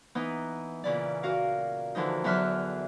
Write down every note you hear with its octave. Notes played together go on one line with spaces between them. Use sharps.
E3 B3 D#4
A#2 C#3 E3 D5
F#4 A#4 F5
D3 E3 F3 D#4
E2 D3 F#3 E5 F6 F#6